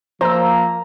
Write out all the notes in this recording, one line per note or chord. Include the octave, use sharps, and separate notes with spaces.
F3 A#3 C5 A#5 E6